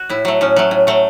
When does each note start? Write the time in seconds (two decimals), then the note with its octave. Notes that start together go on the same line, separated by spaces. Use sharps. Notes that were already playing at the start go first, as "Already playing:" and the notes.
Already playing: F#4
0.09 A2 E4
0.25 F#3 A3
0.41 A2 C#4
0.56 F#3 A3
0.71 A2
0.87 F#3 A3